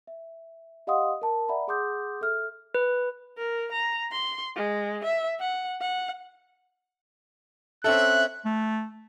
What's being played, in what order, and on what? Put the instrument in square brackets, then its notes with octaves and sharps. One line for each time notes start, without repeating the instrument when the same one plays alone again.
[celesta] E5
G4 D#5 F5 F#5 C6 D#6
A#4 A5
D5 E5 F#5 A#5 B5
G#4 F#5 C6 D6 D#6 G6
A4 E5 F6
[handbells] B4
[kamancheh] A#4
A#5
C6
G#3
E5
F#5
F#5
[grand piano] C4 C#4 A4 [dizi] E5 [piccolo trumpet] F#6
[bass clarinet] A3